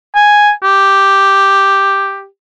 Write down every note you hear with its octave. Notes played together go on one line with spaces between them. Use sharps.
G#5
G4